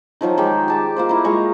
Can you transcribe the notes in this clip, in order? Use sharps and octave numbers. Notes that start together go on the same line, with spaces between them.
D#3 F3 F#3 C5
D#3 G#3 G4 G5
G4 A5 D6
A#3 F4 C5
A#3 E4
G#3 F4 A#5 C#6